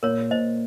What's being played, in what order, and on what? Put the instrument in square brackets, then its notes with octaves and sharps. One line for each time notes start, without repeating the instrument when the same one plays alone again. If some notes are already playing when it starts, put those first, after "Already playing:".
[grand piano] A#2 [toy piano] A#4 C#5
[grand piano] A#2 [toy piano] C5 D#5